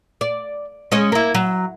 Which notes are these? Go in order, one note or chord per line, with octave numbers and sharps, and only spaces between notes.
D5
G#3 C#4 D#5
A#3 E4
F#3